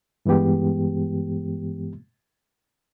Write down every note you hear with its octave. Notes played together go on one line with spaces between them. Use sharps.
G2 E3 G#3 B3 G4